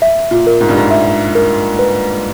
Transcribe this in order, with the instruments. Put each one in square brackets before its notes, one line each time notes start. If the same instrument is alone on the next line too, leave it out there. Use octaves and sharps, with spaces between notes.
[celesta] E5
[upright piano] A#2
[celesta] A#4
[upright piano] G#2
G2
G#2
[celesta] E5
A#4
B4